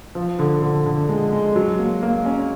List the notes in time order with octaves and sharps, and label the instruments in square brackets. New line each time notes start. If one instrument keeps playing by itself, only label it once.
[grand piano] F3
D3
D3
D3
G#3
G#3
F#3
A#3
A#3
C#4